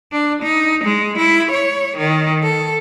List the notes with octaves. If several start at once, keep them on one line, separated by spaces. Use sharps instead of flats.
D4
D#4
G#3
E4
C#5
D#3
A4